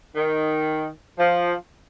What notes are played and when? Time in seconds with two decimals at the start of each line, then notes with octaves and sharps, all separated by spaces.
0.15 D#3
1.17 F3